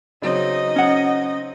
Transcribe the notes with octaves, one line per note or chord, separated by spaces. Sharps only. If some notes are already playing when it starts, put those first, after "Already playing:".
C#3 F#3 C4 D#4 D#5
C#4 F#5